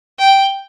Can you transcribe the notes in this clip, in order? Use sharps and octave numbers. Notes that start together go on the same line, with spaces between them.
G5